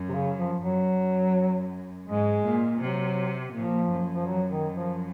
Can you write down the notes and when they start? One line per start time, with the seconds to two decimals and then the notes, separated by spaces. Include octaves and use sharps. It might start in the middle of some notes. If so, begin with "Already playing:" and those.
Already playing: F#2
0.09 C3
0.13 C#3
0.37 F3
0.62 F#2 F#3
2.08 G#2 G#3
2.44 A#2
2.80 C3 F#3
3.54 A#2 F3
3.90 F#2
4.15 F3
4.27 F#3
4.50 D#3
4.75 F3